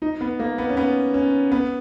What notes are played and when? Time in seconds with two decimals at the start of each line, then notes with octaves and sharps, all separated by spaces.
0.02 D#4
0.21 B3
0.40 A#3
0.58 B3
0.69 C#4
0.77 B3
1.14 C#4
1.52 B3